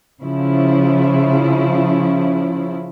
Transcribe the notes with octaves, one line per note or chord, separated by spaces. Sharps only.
C#3 F3 E4